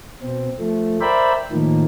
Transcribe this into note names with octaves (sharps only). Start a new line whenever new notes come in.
B2 C4
F3 A3
A#4 C5 D5 E5 G5 B5
A2 D#3 F3 A#3